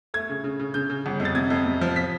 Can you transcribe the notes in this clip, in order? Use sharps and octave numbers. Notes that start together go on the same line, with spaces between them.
A3 G#6
C#3
C#3
C#3
C#3 G6
C#3
G1
F2
A6
C3 G#6
F2
C3
F3
B6